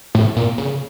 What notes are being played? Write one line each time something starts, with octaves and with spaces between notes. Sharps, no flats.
A2
A#2
C#3